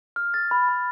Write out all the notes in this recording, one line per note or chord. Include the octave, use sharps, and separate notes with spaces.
F6
A6
B5
B5